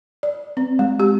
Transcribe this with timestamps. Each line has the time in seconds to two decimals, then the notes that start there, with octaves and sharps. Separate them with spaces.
0.23 D5
0.57 C4
0.79 G#3
1.00 G4